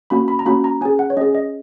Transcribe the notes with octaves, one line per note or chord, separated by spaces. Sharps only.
A#3 C#4 F#4 B5
B5
A#5
A#3 C#4 F#4 B5
A#5
C#4 G#4 G#5
F#5
C#5
C#4 G#4 D#5
D#5